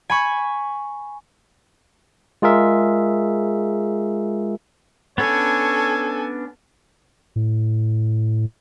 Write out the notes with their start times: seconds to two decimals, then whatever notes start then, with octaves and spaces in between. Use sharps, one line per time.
0.10 G#5 B5 C#6
2.42 G#3 F4 G#4 A#4 E5
5.18 B3 C#4 D4 A4 C#5 G#5
7.36 A2